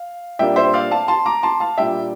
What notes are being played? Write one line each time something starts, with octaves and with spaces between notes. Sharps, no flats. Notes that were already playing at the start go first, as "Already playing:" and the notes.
Already playing: F5
A#2 G3 A#3 D4 E5 G5
C5 E5
D5 F5
F5 A5
A5 C6
A#5 D6
A5 C6
F5 A5
A#2 G3 D4 E5 G5